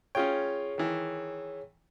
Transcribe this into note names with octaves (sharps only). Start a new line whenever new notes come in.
C#4 F4 G#4 C#5 G5
D#3 E3